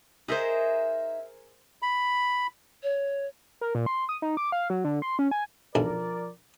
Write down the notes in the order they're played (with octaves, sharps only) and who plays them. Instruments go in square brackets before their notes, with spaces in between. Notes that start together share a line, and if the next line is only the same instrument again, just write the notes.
[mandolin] D#4 E5 [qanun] G#4 A#4 C5
[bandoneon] B5
[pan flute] C#5
[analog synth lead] A#4
A#2
C6
D#6
D#4
D6
F5
F#3
D3
C6
C#4
G#5
[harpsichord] B1 D4 G#5 [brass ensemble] F3 A#4 D5